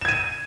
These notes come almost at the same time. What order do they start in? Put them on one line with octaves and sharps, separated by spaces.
E7 G#6 D#7